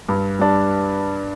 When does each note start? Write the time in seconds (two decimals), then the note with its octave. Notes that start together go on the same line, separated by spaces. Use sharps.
0.09 G2
0.39 G3 D4